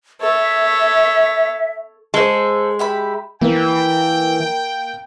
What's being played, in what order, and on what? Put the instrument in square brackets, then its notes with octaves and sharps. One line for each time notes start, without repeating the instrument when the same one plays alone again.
[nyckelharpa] A4 C#5 [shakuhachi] E5
[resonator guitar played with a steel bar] G#3 [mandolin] A4 C5
[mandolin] G4 E5 B5
[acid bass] E3 [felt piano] A#3 [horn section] G5